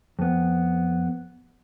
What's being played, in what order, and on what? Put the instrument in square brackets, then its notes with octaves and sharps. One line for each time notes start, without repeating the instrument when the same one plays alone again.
[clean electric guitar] F2 B3